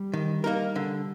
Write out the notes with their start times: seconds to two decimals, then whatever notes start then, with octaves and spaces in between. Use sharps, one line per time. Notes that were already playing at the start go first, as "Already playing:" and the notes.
Already playing: G3
0.13 D#3
0.44 A#3 D#4 A#4
0.76 D3